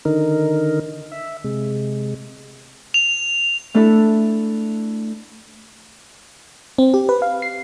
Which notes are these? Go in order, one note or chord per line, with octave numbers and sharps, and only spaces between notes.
D3 D#3 D#4 A#4
E5
C3 G#3
F7
A3 D4 E4 A4 E5
C4
G4
B4
F5
C7